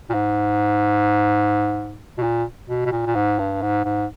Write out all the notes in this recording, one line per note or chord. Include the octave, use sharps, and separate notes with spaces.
A#2
G#2
B2
A#2
B2
B2
A#2
A#2
G#2
G2
G#2
G#2